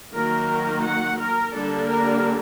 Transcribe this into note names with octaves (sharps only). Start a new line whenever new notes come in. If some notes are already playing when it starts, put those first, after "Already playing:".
D#3 F#3 A#3 A#4
F#5
A#4
D3 G3 A#3 D4 A4
A#4